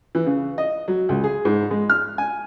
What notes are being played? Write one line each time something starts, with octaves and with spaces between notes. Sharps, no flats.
E3
C#3
D#5
F#3
C#2
G#4
G#2
G#3
F6
G#5